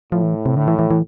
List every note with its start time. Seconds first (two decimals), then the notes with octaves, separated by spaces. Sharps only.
0.12 A2 F3
0.23 E3
0.46 C3
0.56 A2 D3
0.68 E3
0.79 E3
0.91 E3